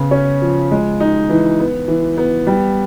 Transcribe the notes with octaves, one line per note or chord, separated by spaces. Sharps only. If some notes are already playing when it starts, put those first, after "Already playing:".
Already playing: C#3 B3
C#4
F3
G#3
D#4
E3
B3
E3
B3
G3